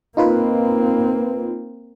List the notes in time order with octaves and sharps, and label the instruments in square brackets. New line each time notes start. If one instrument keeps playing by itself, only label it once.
[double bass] A#3 C4 [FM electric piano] D#4 F4 B4